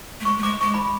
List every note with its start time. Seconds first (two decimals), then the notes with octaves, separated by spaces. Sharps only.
0.20 A3
0.25 G#3 C#6
0.38 A3
0.43 G#3 D6
0.60 G#3 C#6
0.74 B5